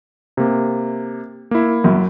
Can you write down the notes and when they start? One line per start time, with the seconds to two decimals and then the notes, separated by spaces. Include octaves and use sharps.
0.37 C3 A#3
1.51 A#3 E4
1.84 F#2